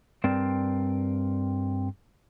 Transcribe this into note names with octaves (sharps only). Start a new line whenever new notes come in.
G2 C4 A#4 D5